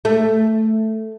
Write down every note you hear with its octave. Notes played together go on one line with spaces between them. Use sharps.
A3